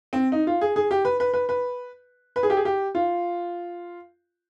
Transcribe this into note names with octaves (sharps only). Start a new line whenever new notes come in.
C4
D#4
F4
G#4
G#4
G4
B4
B4
B4
B4
B4
G#4
G4
G#4
G4
F4